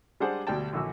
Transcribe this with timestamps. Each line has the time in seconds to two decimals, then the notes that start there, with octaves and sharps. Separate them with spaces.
0.20 G3 G#3 D4 G#4 C5 F#5
0.47 D2 B2 G3 D5 G5 A5
0.73 A#1 D3 E3 F#4 E6